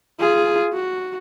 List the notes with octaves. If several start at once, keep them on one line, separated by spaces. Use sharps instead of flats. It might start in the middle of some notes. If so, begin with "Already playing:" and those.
F4 G#4
F#4